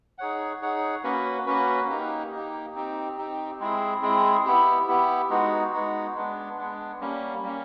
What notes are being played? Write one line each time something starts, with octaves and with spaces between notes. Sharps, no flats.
D#4 G#4 C#5 F#5
D#4 G#4 C#5 F#5
A#3 C#4 F#4 B4
A#3 C#4 F#4 B4
A#3 D#4 G4
A#3 D#4 G4
C4 D#4 G4
C4 D#4 G4
G#3 C4 E4 G#4
G#3 C4 E4 G#4
B3 E4 G4
B3 E4 G4
G#3 B3 D#4 F#4
G#3 B3 D#4 F#4
G#3 B3 D4
G#3 B3 D4
G3 A#3 C#4
G3 A#3 C#4